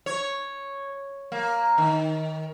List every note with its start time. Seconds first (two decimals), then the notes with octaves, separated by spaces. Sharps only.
0.06 C#5
1.32 A#3
1.78 D#3